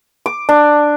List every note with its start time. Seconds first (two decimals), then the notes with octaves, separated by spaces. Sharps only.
0.26 D6
0.49 D4